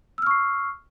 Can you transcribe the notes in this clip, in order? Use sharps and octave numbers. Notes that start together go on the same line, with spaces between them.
C#6 E6 F6 C7